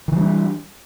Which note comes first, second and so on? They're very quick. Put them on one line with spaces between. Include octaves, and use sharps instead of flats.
D#3 E3 G3 D4